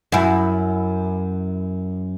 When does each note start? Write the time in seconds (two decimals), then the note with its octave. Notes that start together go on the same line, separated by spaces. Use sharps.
0.12 F#2 E4